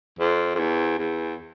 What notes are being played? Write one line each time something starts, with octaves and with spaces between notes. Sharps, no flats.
F2
F2
E2
E2